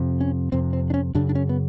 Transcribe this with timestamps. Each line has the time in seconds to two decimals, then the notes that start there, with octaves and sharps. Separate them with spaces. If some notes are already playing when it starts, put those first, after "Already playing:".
Already playing: F2 C3
0.21 C#4
0.52 F2 C3 C4
0.73 C4
0.90 D4
0.94 C#4
1.15 F#2 C#3 D4
1.29 D4
1.35 C#4
1.49 B3